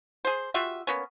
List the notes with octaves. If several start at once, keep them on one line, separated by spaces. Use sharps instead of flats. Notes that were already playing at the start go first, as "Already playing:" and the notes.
G#4 C5
G3 F4 F#4 E5
A#3 B3 C#4